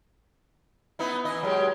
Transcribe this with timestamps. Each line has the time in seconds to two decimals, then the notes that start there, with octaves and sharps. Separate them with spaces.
0.99 B3 D#4 E4
1.25 E3 E4 D#5
1.43 F#3 G#3 G4